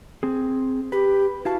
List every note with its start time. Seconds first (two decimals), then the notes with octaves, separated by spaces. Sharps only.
0.23 C4 G#4
0.92 G4 B4
1.45 E4 F#4 F5 A5